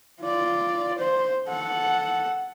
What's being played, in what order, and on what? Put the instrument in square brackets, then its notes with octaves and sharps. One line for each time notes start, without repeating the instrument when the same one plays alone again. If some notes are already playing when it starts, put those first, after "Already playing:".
[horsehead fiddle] F4 D5
C5
A4 F#5